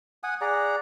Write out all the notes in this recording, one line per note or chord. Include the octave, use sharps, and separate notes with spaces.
F#5 G#5 D#6
G#4 D5 F#5 A#5